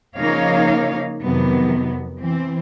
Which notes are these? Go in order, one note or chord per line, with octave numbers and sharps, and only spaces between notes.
C#3 F3 A#3 D#4 C#5 F5
F2 C3 D#3 F#3 B3
E3 C4